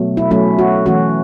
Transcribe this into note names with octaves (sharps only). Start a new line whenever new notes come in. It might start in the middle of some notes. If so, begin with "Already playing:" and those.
Already playing: B2 F#3 A3
E4
F#3 A3 C#4 E4
F#4
E3 A3 C#4 F#4